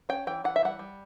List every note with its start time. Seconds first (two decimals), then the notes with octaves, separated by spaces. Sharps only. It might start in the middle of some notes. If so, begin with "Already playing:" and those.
0.09 C#4 G5
0.27 E3 G5
0.44 E3 F#5
0.56 E5
0.63 G3 F#5
0.79 G3